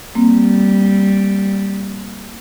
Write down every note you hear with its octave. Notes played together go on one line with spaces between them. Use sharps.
G3 A#3 C4